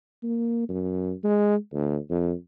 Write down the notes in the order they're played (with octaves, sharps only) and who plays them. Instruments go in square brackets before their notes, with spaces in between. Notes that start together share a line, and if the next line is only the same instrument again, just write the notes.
[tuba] A#3
F#2
G#3
D2
F2